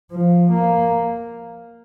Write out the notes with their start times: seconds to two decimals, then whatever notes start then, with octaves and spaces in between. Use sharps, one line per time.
0.12 F3
0.52 A#3